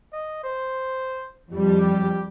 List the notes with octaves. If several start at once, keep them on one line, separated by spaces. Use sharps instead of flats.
D#5
C5
F2 G3
G4